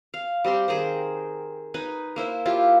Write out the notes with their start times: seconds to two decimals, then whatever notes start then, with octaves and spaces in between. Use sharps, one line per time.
0.14 F5
0.44 G3 C4 G4 C6
0.68 D#3 G#4 A#4 C5
1.74 D#4 B4 G#5
2.16 A#3 E4 C5 E5
2.45 E4 F4 G4